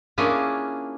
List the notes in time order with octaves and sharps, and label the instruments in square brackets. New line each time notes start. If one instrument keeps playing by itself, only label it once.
[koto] A#3 C#4 D4 E4 F4 G#4